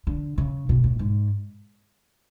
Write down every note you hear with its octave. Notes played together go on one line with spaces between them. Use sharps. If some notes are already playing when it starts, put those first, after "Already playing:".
D3
C#3
B2
A2
G#2